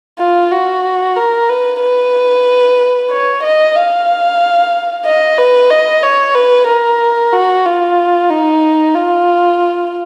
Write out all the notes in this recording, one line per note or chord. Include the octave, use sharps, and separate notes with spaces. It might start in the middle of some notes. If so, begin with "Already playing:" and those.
F4
F#4
A#4
B4
B4
C#5
D#5
F5
D#5
B4
D#5
C#5
B4
A#4
F#4
F4
D#4
F4